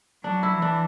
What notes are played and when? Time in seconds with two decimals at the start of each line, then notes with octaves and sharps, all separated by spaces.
0.24 F#3 D4
0.43 E4
0.53 E3
0.62 D4